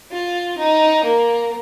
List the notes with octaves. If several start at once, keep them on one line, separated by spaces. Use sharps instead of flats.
F4
D#4
A#3